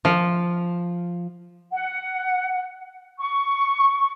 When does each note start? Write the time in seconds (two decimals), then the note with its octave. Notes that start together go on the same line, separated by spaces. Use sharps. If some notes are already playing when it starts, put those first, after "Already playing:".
0.05 F3
1.72 F#5
3.19 C#6